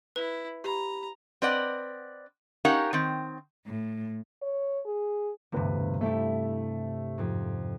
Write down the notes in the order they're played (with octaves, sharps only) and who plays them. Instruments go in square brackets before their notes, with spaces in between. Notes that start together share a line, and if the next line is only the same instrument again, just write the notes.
[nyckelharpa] E4 [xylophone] B4
[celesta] G4 B5 [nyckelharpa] A#5
[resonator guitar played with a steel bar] C4 B4 D5 D#5 F#5
C#4 D#4 G4 A#4 F5 F#5
D#3 C4
[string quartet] A2
[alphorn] C#5
G#4
[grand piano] E1 D2 B4 [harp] G2 C3
[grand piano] A3 [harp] E4 G4 A4
[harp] F2 G#2